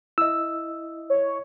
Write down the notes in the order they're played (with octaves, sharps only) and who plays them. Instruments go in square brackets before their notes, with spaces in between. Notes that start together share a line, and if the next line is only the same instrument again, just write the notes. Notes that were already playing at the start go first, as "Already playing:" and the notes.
[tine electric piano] E4 D#5 [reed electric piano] E6
[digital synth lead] C#5